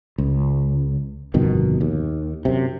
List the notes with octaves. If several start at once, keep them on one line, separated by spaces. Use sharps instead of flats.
C#2
G1 F2 B2 D#3
D#2
F#2 C3